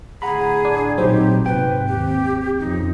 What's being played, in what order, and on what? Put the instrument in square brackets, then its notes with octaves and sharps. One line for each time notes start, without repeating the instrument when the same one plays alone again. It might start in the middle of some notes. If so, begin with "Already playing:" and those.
[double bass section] A2 D3 [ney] G#4 [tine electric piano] F#5 A#5 B5
[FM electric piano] D4 G#5
[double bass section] A1 A#2 [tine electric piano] F#3 D#4 [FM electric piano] C4 [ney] G4
[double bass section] G#2 C3 [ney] B4 [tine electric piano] G5
[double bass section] D#2 [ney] G4
[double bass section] F2 C#3 F3 [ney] D#4